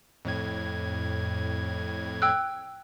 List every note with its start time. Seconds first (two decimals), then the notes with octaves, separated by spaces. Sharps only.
0.25 F2 A2 G#6
2.22 G5 E6 F#6